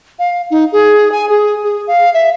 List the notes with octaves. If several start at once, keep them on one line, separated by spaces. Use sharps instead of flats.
F5
D#4
G#4
G#5
G#4
G#4
F5
E5